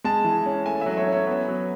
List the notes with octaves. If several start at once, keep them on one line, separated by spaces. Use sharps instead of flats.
G#3 A5
E3
C#4
A3 G#5
F#3 E5
C#5
C#4
C#5
B3
F#3